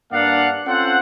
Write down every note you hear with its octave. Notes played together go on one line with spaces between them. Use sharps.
G2 A#3 D4 D5 F5 F#5
C4 C#4 F4 A4 C5 F#5